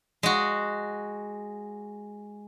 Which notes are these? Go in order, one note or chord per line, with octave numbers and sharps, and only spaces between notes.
G#3 F#4